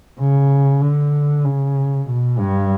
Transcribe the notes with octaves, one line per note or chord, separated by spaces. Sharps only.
C#3
D3
C#3
B2
G2